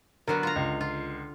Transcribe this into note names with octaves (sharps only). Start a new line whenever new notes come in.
D3 F#3 B3 A#4
F4 A#5
C#2
F4